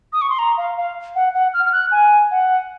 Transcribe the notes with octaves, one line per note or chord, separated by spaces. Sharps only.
D#6
C#6
C6
A#5
F5
F5
F#5
F#5
F6
F6
F#6
G#5
F#5